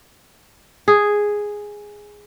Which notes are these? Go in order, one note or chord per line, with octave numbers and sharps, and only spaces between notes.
G#4